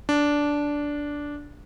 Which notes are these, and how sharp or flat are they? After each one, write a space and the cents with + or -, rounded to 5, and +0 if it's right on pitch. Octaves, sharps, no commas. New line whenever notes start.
D4 -10